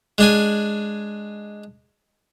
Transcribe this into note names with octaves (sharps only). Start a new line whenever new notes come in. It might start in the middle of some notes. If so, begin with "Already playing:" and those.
G#3 D4 G#5